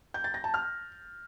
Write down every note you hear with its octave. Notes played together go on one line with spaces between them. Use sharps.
G6
A6
A#6
A5
F6